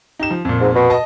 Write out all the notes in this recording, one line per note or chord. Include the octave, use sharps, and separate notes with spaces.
D#4 G4 E7
F3
F2 A#2
G#2
B2
D#5 A5